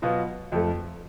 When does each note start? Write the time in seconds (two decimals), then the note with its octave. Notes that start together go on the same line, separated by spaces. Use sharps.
0.02 B2 F#3 B3 F4
0.52 F2 F3 A3